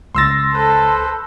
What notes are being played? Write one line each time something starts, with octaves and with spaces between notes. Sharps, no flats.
C#2 C6 E6 A6 A#6
A4 B4 C5